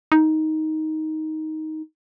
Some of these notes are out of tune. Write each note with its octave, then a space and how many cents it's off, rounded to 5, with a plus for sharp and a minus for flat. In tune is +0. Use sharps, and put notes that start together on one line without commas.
D#4 +10